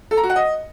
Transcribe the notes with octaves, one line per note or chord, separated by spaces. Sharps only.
A4
A#5
F#4
F#5
D#5